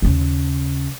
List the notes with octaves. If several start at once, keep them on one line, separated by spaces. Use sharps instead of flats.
D#2 C#3